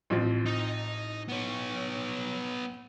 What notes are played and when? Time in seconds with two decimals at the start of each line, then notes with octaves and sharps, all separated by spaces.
0.10 A1 F3 C4
0.46 D#4
1.29 B3 C#5